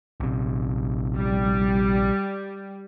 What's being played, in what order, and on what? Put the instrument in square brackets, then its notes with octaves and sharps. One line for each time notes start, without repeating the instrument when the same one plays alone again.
[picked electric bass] A#1 C3
[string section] G3